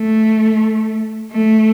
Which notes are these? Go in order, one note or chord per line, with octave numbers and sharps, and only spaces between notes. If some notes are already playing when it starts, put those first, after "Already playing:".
Already playing: A3
A3